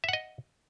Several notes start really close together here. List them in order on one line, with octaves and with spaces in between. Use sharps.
E5 F#5 D#5